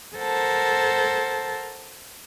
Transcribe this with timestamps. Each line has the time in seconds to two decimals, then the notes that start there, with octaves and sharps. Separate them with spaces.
0.17 A4 A#4 C5 F#5 A5